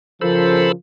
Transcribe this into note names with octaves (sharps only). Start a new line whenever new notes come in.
C#3 F3 A4 A#4 C5 B5